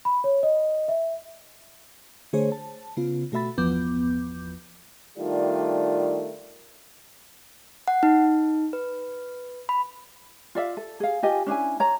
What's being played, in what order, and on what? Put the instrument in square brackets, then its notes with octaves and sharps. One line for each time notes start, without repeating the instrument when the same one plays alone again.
[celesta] B5
C#5
D#5
E5
[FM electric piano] D3 A3 G#4 C5 C#5
A5
C#3 B3 F4
B2 A3 F#4 E5 B5 A6
G1 E2 F3 B3 D6 G6
[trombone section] D#3 G3 A3 D4 F4
[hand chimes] F#5
D#4
B4
B5
[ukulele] F4 D5 E5 F5
A4
G#4 F5
F4 G4 D#5 G#5
C#4 D4 E4 G#5
C#5 A#5